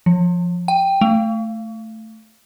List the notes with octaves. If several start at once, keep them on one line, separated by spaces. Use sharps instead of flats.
F3
G5
A3